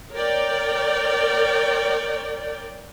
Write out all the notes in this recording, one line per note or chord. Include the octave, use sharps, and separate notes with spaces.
A#4 C#5 D5 G5